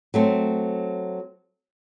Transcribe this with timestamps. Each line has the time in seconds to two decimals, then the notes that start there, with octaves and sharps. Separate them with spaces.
0.14 F#3 A3 C4